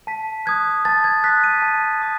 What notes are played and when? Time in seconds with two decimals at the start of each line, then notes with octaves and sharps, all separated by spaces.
0.07 A5 B6
0.46 D#6 F#6 G#6
0.85 A5 A6
1.04 G#6
1.24 D#6 F#6 B6
1.44 D#7
1.62 A5
2.02 D#6